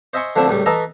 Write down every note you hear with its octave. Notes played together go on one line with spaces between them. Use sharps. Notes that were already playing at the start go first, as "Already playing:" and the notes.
C5 D#5 E5 G#5 C6 C#6
D3 F3 A3 C4 D4 E4
C#2 A2 G3
E3 A4 D#5 E5 A#5